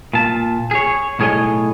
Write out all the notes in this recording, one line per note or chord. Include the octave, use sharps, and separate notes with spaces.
A#2 A5
G#4 C#5
B1 A2 G#4 A4 C#5 D#5